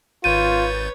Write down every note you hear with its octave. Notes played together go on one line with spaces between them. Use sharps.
G#1 F4 B4 C#5 G6 A6 D#7